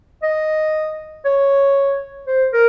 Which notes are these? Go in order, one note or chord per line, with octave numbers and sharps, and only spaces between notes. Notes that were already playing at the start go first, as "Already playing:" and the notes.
D#5
C#5
C5
A#4